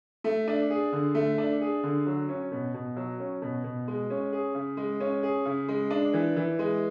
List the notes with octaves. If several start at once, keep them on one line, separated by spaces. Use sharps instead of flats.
A3
D4
G#4
D3
A3
D4
G#4
D3
F#3
C#4
B2
B2
F#3
C#4
B2
B2
G#3
C#4
G#4
C#3
G#3
C#4
G#4
C#3
G#3
D4
E3
E3
G#3